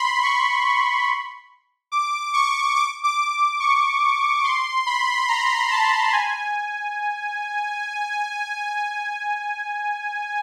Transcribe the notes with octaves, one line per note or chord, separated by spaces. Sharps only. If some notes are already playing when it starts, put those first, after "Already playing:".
Already playing: B5 C6
C#6
C#6
D6
C#6
D6
D6
C#6
C6
B5
A#5
A5
G#5